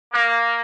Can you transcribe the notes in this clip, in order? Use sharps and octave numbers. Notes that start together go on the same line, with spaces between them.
A#3